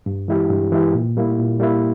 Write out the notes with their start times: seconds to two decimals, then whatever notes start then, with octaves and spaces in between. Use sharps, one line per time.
0.06 G2
0.28 E3 G#3 E4 G4
0.50 G2
0.72 E3 G#3 E4 G4
0.94 A#2
1.17 G3 A#3 E4
1.39 A#2
1.60 G3 A#3 E4